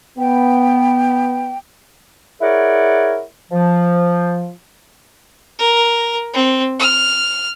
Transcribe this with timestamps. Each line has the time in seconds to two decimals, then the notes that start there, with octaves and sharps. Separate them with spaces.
0.18 B3 G5
2.41 E4 G#4 A#4 C#5 D5 F#5
3.51 F3
5.59 A#4
6.33 C4
6.79 F6